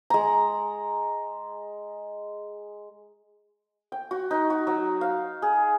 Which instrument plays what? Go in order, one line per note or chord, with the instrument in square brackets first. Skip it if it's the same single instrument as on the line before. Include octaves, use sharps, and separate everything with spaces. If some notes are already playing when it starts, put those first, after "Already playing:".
[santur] G#3 A#5
G5
F#4
D#4
F#4
F#3
F5
G#4